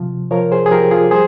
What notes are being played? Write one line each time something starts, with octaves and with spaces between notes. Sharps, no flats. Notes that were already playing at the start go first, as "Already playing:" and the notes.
Already playing: C3 F3
F3 A#4 C#5
G#4 C5
G#4
F3 G4 A#4
F4 G#4
G3 G#4 C5